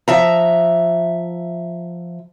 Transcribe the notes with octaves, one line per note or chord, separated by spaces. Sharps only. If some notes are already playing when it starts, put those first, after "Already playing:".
F3 E5 A#5